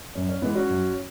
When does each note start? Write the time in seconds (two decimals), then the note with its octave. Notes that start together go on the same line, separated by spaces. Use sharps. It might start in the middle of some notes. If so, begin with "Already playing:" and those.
0.15 F#2 C#4
0.29 C#4
0.42 E3 G#3 B3 E4
0.55 C#4 F#4
0.69 F#2